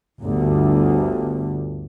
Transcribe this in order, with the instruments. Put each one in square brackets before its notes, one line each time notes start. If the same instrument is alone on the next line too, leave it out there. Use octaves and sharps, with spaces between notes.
[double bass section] G1 D2